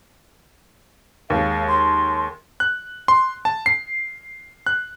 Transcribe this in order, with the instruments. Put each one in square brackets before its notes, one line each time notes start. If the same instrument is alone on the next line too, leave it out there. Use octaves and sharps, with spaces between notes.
[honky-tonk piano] D#2 G#3 [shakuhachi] F5
[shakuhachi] C6
[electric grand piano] F#6
C6
A5
C7
F#6